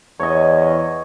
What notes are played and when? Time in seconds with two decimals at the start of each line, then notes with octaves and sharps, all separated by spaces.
0.20 E2 C#5 D#5